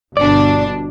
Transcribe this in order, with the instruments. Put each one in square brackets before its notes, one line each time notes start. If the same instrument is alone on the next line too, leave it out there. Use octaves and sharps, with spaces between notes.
[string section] G1 B2 D4 [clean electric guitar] D5